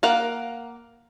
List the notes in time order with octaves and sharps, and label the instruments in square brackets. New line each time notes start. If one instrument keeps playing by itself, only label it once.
[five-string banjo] A#3 A#4 F5 F#5